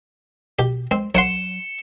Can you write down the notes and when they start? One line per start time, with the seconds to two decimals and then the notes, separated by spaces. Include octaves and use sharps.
0.59 B2 G4
0.91 G#3 C4
1.15 F#3 C#5 F#5 C6 C#7 E7 G7